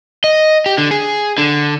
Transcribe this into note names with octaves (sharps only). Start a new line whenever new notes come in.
D#5
G4
D3
G#4
D3